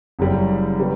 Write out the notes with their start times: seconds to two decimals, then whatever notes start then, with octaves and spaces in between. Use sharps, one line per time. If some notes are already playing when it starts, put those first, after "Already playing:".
0.19 F#1 F#2 C#3 G3
0.79 C#3 G3 B3